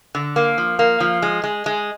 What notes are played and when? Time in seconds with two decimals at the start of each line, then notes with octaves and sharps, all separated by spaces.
0.15 D3
0.36 A#3
0.58 F3
0.79 A#3
1.00 F3
1.22 G#3
1.44 G#3
1.66 G#3